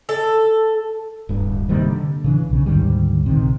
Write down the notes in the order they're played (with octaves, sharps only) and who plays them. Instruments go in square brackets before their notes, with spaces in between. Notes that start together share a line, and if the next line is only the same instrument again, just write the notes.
[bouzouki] A4
[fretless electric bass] D1 G2
C3 D#3 G3 A#3
D3
C#3 E3 D4
B1 C#3
D2 G#2 D#3 G3
A#1 C3 D#3